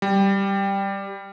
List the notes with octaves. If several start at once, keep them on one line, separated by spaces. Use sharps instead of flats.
G3